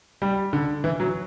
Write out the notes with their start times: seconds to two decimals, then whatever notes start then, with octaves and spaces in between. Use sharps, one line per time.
0.22 G3
0.53 D3
0.84 E3
1.00 F#3